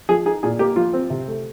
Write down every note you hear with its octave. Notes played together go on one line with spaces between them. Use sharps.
F3 G#4
D#4 G#4
A#2 G#4
A#3 G4
F3 F4
C4
C3
A3